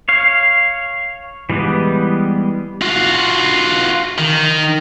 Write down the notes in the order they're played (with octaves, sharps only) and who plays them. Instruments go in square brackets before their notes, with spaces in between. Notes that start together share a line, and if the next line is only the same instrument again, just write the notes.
[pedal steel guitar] C#5 F5
E3 G3 G#3 B3
[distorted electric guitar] F4 F#4
D#3